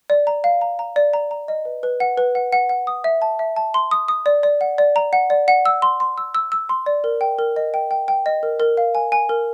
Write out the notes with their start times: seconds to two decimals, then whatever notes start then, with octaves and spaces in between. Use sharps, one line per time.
0.10 D5
0.27 A#5
0.44 F5
0.62 A#5
0.79 A#5
0.96 D5
1.13 A#5
1.31 A#5
1.48 D#5
1.65 B4
1.83 B4
2.00 F#5
2.18 B4
2.35 F#5
2.52 F#5
2.69 F#5
2.87 D#6
3.04 E5
3.22 A5
3.39 E5
3.56 A5
3.74 C6
3.91 D#6
4.08 D#6
4.26 D5
4.43 D5
4.61 F#5
4.78 D5
4.96 A#5
5.13 F#5
5.30 D5
5.48 F#5
5.66 E6
5.82 C6
6.00 C6
6.18 E6
6.35 E6
6.52 E6
6.69 C6
6.86 D5
7.04 A#4
7.21 G5
7.39 A#4
7.56 D#5
7.74 G5
7.91 G5
8.08 G5
8.26 D#5
8.43 A#4
8.60 A#4
8.77 F5
8.95 G#5
9.12 G#5
9.29 A#4